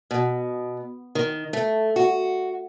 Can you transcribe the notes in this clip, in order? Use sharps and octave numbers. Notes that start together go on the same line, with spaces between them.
B2
D#3
A3
F#4